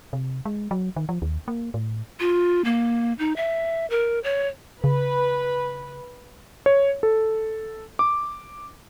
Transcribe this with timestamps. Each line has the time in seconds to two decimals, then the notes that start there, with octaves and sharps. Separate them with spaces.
0.13 C3
0.45 G#3
0.71 F#3
0.96 D#3
1.09 F3
1.22 D#2
1.48 A#3
1.74 A2
2.20 F4
2.65 A#3
3.19 D#4
3.36 E5
3.90 A#4
4.24 C#5
4.84 C#3 B4
6.66 C#5
7.03 A4
7.99 D6